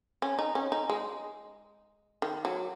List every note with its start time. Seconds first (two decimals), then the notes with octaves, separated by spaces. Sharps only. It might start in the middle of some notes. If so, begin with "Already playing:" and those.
0.22 C#4
0.39 D#4
0.55 C#4
0.72 D#4
0.90 G#3
2.22 D#3
2.45 F#3